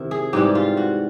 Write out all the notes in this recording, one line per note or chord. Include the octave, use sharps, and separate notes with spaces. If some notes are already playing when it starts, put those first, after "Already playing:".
Already playing: C3 D#3 E4
G#4
G#2 E3 G3 G4
F4
F#4